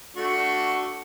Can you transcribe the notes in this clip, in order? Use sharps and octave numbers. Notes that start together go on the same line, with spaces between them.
A3 D4 F#4